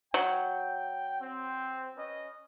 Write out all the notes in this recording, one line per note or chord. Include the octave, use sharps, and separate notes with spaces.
F#3 G5
C4
C#4 B4 D#5